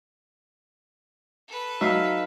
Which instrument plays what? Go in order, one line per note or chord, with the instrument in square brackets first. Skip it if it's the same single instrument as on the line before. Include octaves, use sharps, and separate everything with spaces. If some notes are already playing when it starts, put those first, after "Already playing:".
[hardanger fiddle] A4 B4
[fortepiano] F#3 [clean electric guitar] D#4 [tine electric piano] E5 F5